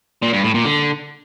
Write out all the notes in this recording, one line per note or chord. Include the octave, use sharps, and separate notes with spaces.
A#2
G2
A2
A#2
D3